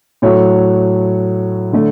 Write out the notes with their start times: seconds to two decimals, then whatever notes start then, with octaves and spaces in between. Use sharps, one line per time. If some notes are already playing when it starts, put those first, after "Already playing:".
0.22 A2 F#3 A3 C#5
1.73 D3 A3